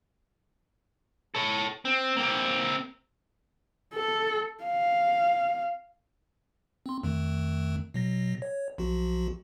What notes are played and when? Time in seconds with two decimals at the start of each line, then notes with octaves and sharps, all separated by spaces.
1.35 A4 C#5
1.85 C4
2.16 A#3 C4
3.94 A4
4.64 F5
6.86 C4 C6
7.03 F2 D#3 A3
7.94 B2 F#3 A#6
8.42 C#5
8.78 B1 F3 F#4